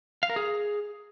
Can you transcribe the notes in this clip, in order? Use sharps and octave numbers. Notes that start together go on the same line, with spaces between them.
F5
A#4
G#4